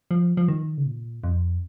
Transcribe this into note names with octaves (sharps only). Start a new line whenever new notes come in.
F3
F3
D#3
C#3
A#2
F2